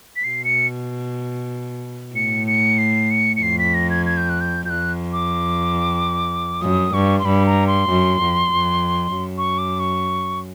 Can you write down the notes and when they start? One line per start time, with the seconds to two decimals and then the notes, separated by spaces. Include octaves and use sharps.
0.16 B6
0.24 B2 C7
0.45 C#7
2.15 A2 C#7
2.47 C#7
2.78 C7
3.11 C#7
3.36 C#7
3.42 F2 C7
3.59 B6
3.74 A#6
3.90 G#6
4.06 G#6
4.17 G6
4.29 F#6
4.41 G6
4.65 G6
4.70 F2 F#6
5.13 D6
6.62 F#2 D#6
6.94 G2 C#6
7.19 C6
7.25 G2 B5
7.46 A#5
7.67 C6
7.89 F#2
8.21 F2
8.52 F2
9.16 F#2
9.38 C#6
9.58 D6
9.80 C#6